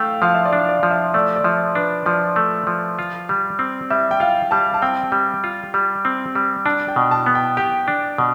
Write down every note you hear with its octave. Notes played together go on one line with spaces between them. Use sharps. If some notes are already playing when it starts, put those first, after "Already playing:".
Already playing: A3 F5 G5
F3 F5
E5
D5
D4
D5
F3
E5
A3 D5
D5
F3 E5
D4 B4
F3 D5
A3
F3
F4
G3
C4
G3 E5
G5
F4 F5
G3 A5
A5
C4 G5
G3
F4
G3
C4
G3
D4 A5
G5
B2
A5
B3
G5
G4 G5
D4
B2